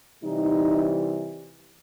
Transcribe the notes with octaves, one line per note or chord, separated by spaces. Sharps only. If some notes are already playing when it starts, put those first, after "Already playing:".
C3 E3 G3 D#4